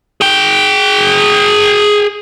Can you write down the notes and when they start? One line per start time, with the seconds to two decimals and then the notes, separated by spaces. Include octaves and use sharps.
0.21 G#4 G5